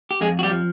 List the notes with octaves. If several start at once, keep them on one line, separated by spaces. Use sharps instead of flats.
G4
F2 G#3 G#4
F#4
G3 G4
F3